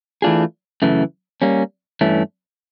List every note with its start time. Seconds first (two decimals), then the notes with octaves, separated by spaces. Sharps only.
0.22 E3 A3 D4 F4 G#4
0.82 F#2 C#3 E3 A3
1.42 G3 A#3 C#4
2.01 G2 E3 A3 C#4